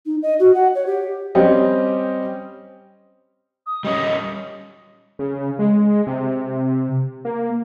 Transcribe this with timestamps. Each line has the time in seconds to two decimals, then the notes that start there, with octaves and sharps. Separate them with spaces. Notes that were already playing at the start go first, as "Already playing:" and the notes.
0.06 D#4
0.23 D#5
0.39 F#4
0.55 F#5
0.75 C#5
0.87 G4
1.35 G3 C4 C#4 G4 D#5
3.66 D#6
3.85 G3 C#4 D#5
5.19 C#3
5.59 G#3
6.07 C3
7.25 A#3